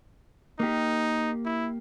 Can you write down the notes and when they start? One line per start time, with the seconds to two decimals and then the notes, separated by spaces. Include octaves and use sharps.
0.60 A#3 D#4 G4
1.45 E4